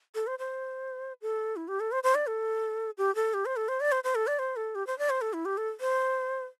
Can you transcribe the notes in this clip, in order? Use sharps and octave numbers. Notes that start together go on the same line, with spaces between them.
A4
C5
C5
A4
E4
G4
A4
C5
C5
D5
A4
G4
A4
G4
C5
A4
C5
D5
C5
C5
A4
D5
C5
A4
G4
C5
D5
C5
A4
E4
G4
A4
C5